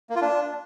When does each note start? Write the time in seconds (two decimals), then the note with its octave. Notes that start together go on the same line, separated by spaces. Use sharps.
0.10 A#3
0.16 F4
0.22 D4